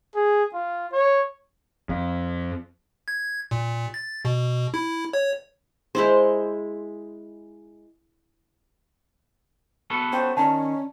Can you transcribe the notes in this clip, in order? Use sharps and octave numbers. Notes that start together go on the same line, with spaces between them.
G#4
F4
C#5
F2
G#6
A#2
A6
B2
E4
C#5
G#3 E4 C5
B3 F#4 A4
C#4 F4 C5 G5
D#3 C#4 D5 G#5 A5